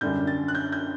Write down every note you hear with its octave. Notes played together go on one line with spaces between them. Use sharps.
F#2 D3 G3 G6
A6
F#6
G6
G6